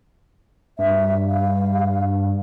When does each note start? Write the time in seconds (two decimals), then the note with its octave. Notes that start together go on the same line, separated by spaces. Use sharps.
0.79 G2 E5
1.27 F5